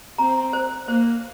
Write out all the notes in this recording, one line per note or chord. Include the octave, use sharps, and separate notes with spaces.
C4 A#5
C5
A#3 C5